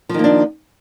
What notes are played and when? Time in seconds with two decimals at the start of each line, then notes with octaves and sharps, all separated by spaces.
0.09 F3
0.14 D#3
0.19 A#3
0.24 D4